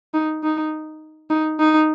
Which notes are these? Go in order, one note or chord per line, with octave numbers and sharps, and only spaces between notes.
D#4
D#4
D#4
D#4